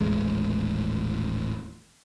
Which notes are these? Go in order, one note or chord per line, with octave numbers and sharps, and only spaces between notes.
D#1 A1 G#3